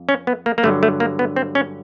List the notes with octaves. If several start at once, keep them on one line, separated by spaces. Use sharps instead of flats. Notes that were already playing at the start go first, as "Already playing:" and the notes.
Already playing: F2
C#4
B3
A#3
A#3
G2 D3 F#3 A3
A3
A#3
B3
C4
C#4